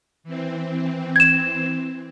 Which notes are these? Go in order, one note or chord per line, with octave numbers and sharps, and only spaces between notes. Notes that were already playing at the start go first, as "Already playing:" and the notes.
E3 C4
G#6 E7